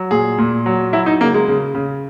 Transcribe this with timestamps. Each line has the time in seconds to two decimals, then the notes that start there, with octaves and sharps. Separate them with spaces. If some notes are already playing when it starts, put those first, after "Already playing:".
Already playing: F#3
0.11 A#2 G#4
0.38 A#2
0.66 F#3
0.93 F#3 E4
1.06 D#4
1.20 C#3 A#3
1.34 G#3
1.48 C#3
1.75 C#3